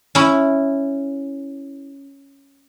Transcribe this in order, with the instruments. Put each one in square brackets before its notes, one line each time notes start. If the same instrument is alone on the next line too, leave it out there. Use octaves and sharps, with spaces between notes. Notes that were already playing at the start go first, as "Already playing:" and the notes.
[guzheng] C#4 E4